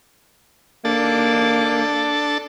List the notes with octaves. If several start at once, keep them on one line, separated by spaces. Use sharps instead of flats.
A#3 D4 A4